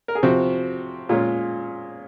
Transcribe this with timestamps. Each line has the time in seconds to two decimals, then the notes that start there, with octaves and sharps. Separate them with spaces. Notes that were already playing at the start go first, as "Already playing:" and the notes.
0.08 A#4
0.15 G#4
0.23 C3 F3 C4 F#4
1.09 A#2 G#3 C#4 F4 G#4